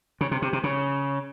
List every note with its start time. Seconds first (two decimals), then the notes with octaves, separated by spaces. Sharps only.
0.21 C#3
0.31 C3
0.42 C3
0.53 C3
0.64 C#3